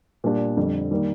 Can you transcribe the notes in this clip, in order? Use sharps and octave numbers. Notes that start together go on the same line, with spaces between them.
A#2 G3 D4 G4
F2 D3 G3
D#3 G3 A#3